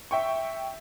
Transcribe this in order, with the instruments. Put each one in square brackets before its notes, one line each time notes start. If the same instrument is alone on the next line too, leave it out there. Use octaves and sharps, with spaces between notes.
[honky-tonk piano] E5 G5 C#6